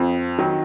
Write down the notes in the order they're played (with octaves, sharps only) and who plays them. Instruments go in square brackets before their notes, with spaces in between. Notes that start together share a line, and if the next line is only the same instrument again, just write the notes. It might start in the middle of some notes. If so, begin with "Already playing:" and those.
Already playing: [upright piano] F2
D#3 F#3